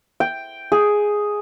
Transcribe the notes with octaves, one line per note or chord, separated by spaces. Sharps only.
G5
G#4